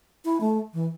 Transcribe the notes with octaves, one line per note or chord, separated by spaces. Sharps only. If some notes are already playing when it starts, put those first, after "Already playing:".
E4
A3
E3